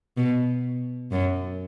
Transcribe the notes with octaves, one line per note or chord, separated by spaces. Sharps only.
B2
F#2